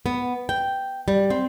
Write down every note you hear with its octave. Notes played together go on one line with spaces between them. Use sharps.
B3
G5
G3
C4